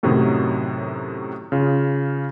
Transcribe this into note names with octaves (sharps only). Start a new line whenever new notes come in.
F#2 A2 C3 D#3 F#3
C#3 F4